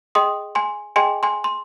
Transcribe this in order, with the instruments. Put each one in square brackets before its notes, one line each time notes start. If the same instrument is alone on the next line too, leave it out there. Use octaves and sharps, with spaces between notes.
[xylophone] G#4 D#5 G5 C6 D#6
G#5 C6
G#4 D#5 G5 G#5 C6
G#5 C6
C6